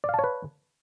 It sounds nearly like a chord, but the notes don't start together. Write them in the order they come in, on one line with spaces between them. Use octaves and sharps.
D5 F5 A5 C#5 B4